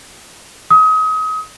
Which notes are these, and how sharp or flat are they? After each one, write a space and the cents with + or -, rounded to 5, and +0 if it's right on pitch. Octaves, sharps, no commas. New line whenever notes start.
D#6 +30